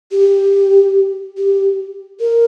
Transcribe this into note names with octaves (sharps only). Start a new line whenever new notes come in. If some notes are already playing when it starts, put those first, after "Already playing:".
G4
G4
A#4